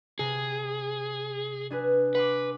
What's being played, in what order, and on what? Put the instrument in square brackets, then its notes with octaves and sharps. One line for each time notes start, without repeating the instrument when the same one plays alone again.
[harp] C3 [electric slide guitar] G#4
[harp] D4 G#4 B4
[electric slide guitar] B4 [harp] F#5 C6 D6